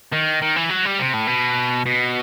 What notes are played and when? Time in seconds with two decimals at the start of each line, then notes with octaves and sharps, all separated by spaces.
0.12 D#3
0.42 D#3
0.56 E3
0.70 F#3
0.85 G3
0.99 C3
1.14 A2
1.27 B2
1.86 B2